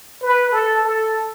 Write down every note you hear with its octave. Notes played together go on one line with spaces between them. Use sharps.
B4
A4
A4